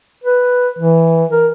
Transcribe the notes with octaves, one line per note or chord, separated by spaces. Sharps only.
B4
E3
A#4